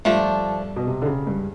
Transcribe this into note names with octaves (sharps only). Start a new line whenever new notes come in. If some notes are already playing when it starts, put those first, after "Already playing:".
G2 F3 A3 D4
B2
C3
D3
C#3
G2